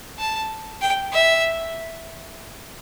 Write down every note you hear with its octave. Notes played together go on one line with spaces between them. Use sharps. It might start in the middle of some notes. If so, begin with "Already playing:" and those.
A5
G5
E5